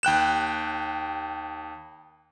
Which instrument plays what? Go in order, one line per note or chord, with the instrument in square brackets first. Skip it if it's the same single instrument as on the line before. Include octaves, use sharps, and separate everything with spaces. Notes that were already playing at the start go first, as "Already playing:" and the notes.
[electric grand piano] D#2 G5 F#6 E7